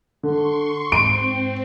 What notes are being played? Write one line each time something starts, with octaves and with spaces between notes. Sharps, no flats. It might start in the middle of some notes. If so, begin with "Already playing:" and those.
D3 C6 C#6
G#2 C4 C6 D7